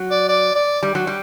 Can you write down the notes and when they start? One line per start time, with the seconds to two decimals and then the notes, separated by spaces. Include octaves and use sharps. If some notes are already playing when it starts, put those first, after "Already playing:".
Already playing: F#3
0.11 D5
0.29 D5
0.56 D5
0.83 G3
0.95 F#3
1.07 G3